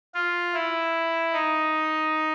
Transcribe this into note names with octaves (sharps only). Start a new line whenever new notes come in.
F4
E4
D#4